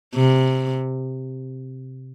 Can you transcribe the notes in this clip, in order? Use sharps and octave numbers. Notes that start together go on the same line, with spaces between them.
C3